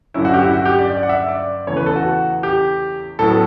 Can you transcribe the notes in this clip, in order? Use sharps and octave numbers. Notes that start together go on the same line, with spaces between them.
G2 D3 F#3 C#4 E4
F#4
G4
F#4
E4
F#4
G4
D5
D5
F#5
E5
D5
E2 C#3 E3 A3 C#5
B4
A4
F#4
G4
A2 F#3 B3 A4